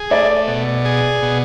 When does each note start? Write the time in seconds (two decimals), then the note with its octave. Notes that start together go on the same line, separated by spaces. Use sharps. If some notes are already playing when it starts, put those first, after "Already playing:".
Already playing: G#4
0.10 A3 D5
0.48 B2
0.85 G#4
1.22 B2